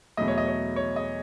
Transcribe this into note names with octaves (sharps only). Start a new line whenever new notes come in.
E2 B2 F#3 A3 D#5
C#5
D#5
C#5
C#5
D#5